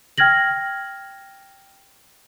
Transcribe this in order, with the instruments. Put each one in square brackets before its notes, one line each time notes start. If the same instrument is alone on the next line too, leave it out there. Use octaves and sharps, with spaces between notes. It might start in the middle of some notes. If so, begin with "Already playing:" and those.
[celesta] G5 F6 G#6 A#6 F#7